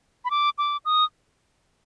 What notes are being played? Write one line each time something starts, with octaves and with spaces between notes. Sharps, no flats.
B5
D6
D6
D#6